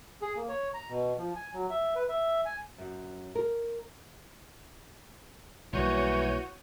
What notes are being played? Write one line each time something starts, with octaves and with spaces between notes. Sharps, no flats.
G#4
A#3
C#5
A#5
B2
F3
G#5
F#3
E5
B4
E5
G#5
F#2
A#4
B1 E3 G3 A#3 F#4 C#5 G6 D#7